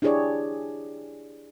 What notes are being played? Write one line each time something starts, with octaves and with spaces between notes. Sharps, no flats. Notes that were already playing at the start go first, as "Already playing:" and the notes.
D4 E4 G4 G#4 C#5 D5